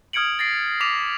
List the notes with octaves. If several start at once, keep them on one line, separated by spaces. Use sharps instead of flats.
D#6 F6 G#6 C#7 D7 F#7
A6 A#6 C7 D7
D6 B6 F7